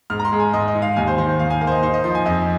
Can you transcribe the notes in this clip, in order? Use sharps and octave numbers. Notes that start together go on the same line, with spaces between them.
G#2 F6
A#5
C6
G#3
G#5
G#2 D#5
D#5
D#4
F5
D#2 G#5
C5
D#3 C5
D#2 F5
G#5
A#3 F5
C5
D#5
D#4 C5
D#5
F3 C6
G#5
F2 D#5